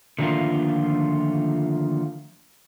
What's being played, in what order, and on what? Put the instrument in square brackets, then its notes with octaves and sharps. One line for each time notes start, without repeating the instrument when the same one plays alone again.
[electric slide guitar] D3 D#3 F3 A3 A#3 F4